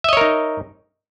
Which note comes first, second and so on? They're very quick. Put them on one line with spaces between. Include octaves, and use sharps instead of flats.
E5 D#5 C#5 A#4 D#4